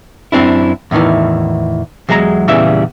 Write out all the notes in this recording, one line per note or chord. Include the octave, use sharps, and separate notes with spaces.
F#2 C4 D4 E4
E2 A2 C3 D#3 E3
E2 F#3 G#3 F5 A#5
E2 A#2 C#3 E3 G3 E5